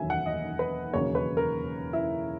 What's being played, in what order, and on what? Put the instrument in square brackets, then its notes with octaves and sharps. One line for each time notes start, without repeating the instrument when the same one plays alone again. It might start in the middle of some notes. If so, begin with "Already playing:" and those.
Already playing: [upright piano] E1 D#2 D#3 F#3 A#3 E5 G#5
F#5
D#5
B4
E1 D#2 C#3 F#3 A#3 C#5
B4
A#4
E4